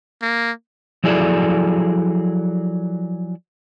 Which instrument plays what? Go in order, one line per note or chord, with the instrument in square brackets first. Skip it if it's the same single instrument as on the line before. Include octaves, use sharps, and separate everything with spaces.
[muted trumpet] A#3
[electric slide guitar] F3 F#3 E4 G#4 A4 D5